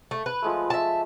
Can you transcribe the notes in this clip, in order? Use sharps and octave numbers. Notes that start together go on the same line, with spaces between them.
A3
B4
F3 G#3 A3
E5 A5